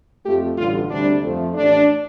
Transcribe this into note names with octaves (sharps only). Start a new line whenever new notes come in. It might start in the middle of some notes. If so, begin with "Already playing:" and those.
F2 F3 A3 G4
A1 G2 D3 G3 F4
D2 C3 G3 D4
F2 F3 A3
A1 A2 A3 D4